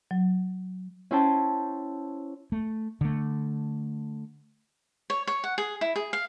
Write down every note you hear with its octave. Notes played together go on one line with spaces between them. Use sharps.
F#3
C#4 E4 C5 G5 A5
A3
D3 A3
C#5
C#5
F#5
G#4
E4
G#4
F5